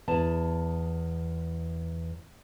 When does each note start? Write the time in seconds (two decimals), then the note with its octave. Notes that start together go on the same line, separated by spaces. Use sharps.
0.08 E2 A5